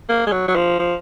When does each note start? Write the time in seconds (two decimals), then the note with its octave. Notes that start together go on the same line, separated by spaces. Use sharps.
0.09 A#3
0.27 G#3
0.32 F#3
0.48 F#3
0.56 F3
0.79 F3